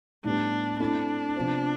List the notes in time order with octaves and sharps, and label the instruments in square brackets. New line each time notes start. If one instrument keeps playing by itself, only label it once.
[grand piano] A2 G3 B3 [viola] D4
[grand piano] A3 C4 E4 [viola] D4
[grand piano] C3 F3 B3 F4 C5